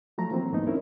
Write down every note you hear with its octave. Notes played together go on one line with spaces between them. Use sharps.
F3 F#3 A3 A#5
E3 F#3 A#3 C4
D2 G#2 A3 B3 D#4
C4 C#4 E4 A#4